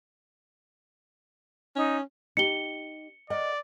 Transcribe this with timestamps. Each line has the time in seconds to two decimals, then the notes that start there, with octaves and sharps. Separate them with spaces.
1.76 C#4 D#4
2.37 D#4 G4 C#7 G7
3.30 A#4 D5 D#5 F#5